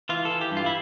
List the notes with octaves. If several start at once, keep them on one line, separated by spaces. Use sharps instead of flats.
E3 F4
A4
E3
G4
G2
F4
E4